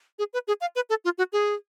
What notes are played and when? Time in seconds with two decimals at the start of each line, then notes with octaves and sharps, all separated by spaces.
0.19 G#4
0.33 B4
0.48 G#4
0.61 F5
0.76 B4
0.90 A4
1.05 F4
1.18 F#4
1.33 G#4